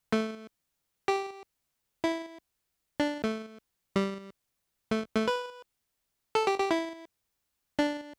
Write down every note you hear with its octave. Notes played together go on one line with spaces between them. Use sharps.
A3
G4
E4
D4
A3
G3
A3
A3
B4
A4
G4
G4
E4
D4